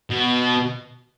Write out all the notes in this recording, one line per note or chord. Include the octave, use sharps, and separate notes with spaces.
B2